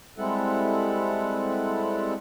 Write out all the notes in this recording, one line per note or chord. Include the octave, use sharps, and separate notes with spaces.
G3 G#3 C4 E4 A4 F#5